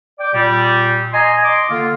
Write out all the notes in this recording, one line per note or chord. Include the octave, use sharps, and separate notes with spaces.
D5 G5 D6
A#2 G3
D#5 G#5 A#5 C6
D#5 C6 D6
D3 A#3 F4